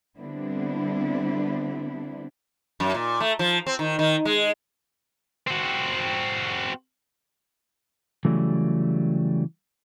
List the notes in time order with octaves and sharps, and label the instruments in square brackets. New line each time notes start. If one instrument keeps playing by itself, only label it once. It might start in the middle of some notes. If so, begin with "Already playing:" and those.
[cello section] D3 G3 B3 C4 D4 E4
[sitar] F#2
A#2
A3
F3
C4
D#3
D#3
G#3
[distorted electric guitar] C4 F#4
[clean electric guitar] C#3 E3 F#3 G3 A3